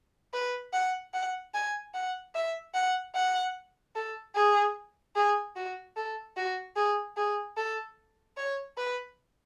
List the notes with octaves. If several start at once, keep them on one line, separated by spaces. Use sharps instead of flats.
B4
F#5
F#5
G#5
F#5
E5
F#5
F#5
A4
G#4
G#4
F#4
A4
F#4
G#4
G#4
A4
C#5
B4